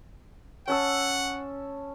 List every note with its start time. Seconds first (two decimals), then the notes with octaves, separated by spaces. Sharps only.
0.68 C#4 F#5 A5 E6